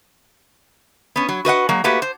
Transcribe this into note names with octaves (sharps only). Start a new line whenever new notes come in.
B3 C#4
F#3
F#4 B4 D#5 F#5
F#3 G#3 A#3
A3 A#3 F#4 G4 B4
C5